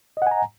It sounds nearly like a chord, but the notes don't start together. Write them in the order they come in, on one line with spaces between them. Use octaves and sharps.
D#5 F#5 G#5 A#5